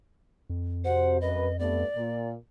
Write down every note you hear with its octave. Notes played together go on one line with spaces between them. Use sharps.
F2
C3 F#4 C5 F#5
F#2 B4 D#5
G2 A3 B3 D5
A#2